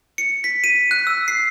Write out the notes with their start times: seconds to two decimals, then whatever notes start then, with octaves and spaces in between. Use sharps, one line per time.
0.18 C#7
0.44 B6
0.64 D#7
0.91 F#6
1.07 E6
1.28 C7